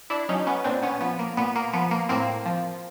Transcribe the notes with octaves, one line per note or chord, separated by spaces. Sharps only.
D4 E4
F#3 C#4 D#4
B3 C#4
A#2 C4 D4
B3 C#4
F3 B3
A#3
A#2 B3
A#3
F3 B3
A#3
A2 A#3 C4
F3